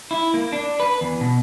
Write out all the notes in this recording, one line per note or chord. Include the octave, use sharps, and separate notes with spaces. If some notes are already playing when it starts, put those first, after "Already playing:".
E4
A#3
D4
B4
E2
B2